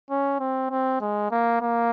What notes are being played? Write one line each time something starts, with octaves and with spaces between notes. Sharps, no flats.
C#4
C4
C4
G#3
A#3
A#3